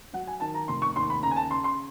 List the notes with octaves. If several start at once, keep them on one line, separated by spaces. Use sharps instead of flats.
F#3 F#5
G#5
D#3 A5
A#5
F1 C6
C#6
D#2 C6
B5
C#3 A#5
G#5
A5
C#3 C6
C6